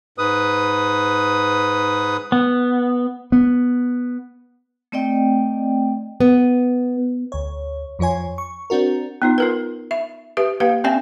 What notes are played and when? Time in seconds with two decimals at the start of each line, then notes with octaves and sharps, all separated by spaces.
0.18 G#2 B4 D#6
2.32 B3
3.32 B3
4.92 A3 C4 D5 D#5 G5
6.20 B3
7.32 D2 C#5
7.99 F2 F3 F4 C#5 G#5
8.38 C#6
8.70 C4 D4 F#4 A#4
9.22 B3 D#4 F4
9.38 F4 A#4 B4
9.91 E5
10.37 G4 B4 E5
10.60 A#3 G4 B4 F5
10.84 C4 C#4 D5 E5 G5 G#5